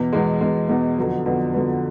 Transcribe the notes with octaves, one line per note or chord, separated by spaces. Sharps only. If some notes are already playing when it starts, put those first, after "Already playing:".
Already playing: E2 B2
E2 B2 G#3
E2 B2 G#3
E2 B2 G#3
F2 D3 F#3 B3
F2 D3 F#3 B3
F2 D3 F#3 B3